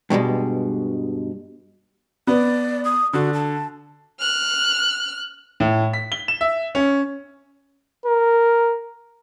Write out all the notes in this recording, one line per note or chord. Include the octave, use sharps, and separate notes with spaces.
G2 B2 G3 G#3
B3 D5
D#6
D3 F#4
A5
F6 F#6
A2
B6
G7
E7
E5
C#4
A#4